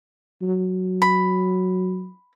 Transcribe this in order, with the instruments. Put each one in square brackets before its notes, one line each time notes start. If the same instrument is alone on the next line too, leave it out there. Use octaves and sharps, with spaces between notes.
[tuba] F#3
[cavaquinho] B5